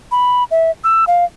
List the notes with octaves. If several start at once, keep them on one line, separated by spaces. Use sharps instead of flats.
B5
E5
E6
F5